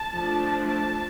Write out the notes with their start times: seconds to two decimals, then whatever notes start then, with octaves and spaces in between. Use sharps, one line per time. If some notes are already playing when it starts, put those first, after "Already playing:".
Already playing: A5
0.14 F3 A3 D4
0.67 A5